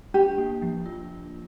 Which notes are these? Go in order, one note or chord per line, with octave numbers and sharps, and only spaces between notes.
D4 G4
A#3
F3
F4